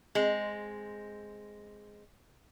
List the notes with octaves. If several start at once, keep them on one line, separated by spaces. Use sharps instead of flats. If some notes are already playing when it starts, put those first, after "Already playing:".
G#3 C4